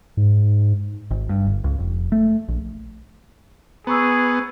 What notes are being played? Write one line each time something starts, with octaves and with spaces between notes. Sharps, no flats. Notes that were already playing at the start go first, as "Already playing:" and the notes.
G#2
G#1
G2
G1
C#2
F1
A3
A#1
B3 G#4 A#5 C#6 E6